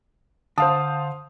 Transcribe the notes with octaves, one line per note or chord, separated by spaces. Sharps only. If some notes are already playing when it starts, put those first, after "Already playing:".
D3 C5 F5 A5 D#6